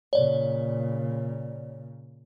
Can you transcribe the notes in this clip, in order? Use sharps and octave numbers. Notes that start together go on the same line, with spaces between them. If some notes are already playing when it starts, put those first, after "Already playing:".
A#2 C#3 C#5 D5